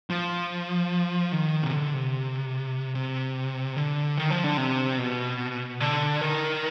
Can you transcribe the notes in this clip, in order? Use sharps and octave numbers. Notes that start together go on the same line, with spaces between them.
F3
D#3
C3
D3
C3
C3
D3
D#3
F3
D3
C3
B2
D3
D#3